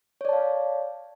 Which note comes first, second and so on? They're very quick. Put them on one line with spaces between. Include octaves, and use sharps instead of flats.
C#5 D5 A5 F5